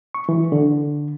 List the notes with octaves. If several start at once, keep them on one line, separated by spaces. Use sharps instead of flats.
C#6
E3
D3